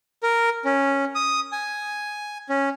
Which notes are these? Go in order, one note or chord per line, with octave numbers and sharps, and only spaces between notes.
A#4
C#4
D#6
G#5
C#4